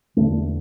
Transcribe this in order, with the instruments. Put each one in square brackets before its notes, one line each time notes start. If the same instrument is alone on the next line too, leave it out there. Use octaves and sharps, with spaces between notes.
[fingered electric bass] E2 D3 A3